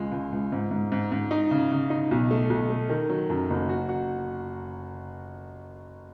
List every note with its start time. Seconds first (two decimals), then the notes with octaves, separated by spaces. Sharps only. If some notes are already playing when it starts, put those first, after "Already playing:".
Already playing: C#2 G#3
0.11 C#2
0.32 C#2
0.52 G#2
0.71 G#2
0.92 G#2
1.12 G#2
1.31 D#4
1.51 C#3
1.71 C#3
1.90 D#4
2.11 B1
2.31 A3
2.50 B1
2.70 A3
2.89 D#3
3.09 F#3
3.30 F#2
3.50 F#1
3.69 F#4
3.89 F#4